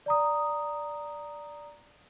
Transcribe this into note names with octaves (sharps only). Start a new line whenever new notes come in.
D5 A#5 D#6